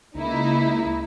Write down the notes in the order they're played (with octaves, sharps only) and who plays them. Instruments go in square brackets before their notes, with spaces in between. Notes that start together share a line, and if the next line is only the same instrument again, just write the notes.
[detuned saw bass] C#2 [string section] A#3 D#4 E4